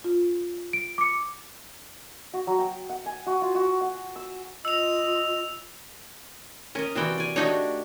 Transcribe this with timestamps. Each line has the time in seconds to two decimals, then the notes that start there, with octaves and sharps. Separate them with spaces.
0.04 F4
0.73 D7
0.98 D6 C#7
2.34 F#4
2.47 F#3
2.59 G5
2.90 F#5
3.06 G#5
3.27 F#4
3.42 F4
3.55 F#4
3.81 F#5
4.16 E6
4.65 F4 D#5 E6 F7
6.75 C#4 A#4 D#5
6.95 C3 E3 F#4 D5 G5
7.18 D5 G#5
7.36 A3 D4 D#4 F#4 G4 C#5